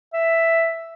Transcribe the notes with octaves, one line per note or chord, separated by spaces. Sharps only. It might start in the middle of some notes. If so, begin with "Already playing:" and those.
E5